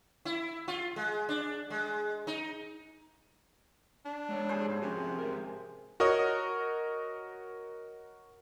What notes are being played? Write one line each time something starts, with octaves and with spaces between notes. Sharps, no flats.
E4
F4
G#3
D4
G#3
D#4
D4
G#3 C#5 D5
G#4 C5
G#2
C3 F3 C#4 F#4
G#2 A#4
F#4 A#4 C#5 D#5 D#6